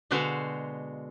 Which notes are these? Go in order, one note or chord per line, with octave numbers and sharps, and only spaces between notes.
B2 D3 G#3 F#4 C5 F5